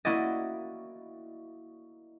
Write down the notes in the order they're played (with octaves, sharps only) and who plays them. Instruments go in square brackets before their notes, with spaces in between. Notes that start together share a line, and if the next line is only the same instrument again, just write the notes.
[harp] A#3 E4 F#4 D5 D#5